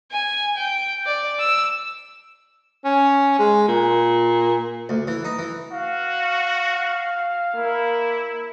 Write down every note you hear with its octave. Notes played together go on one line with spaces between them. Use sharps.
G#5
G5
D5
E6
C#4
G#3
A#2
D2
E3
D#4
E3
F#4 F5
A#3 E4